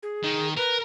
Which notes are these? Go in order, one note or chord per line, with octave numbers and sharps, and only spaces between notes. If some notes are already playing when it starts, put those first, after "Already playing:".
G#4
D#3
A#4 B4